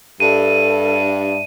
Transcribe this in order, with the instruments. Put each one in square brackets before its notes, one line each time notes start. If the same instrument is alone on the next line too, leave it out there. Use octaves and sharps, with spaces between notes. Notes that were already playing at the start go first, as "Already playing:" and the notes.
[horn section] G2 [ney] A4 [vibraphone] D5 E5 A5 [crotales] D#7